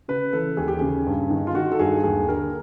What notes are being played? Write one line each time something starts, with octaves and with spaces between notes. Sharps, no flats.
C#3 B4
E3 A4
D#2 G#4
G4
C#3 G#4
G2
D#3
F4
D#3 F#4
A4
G2 G#4
D#2 G#4
D3 A#4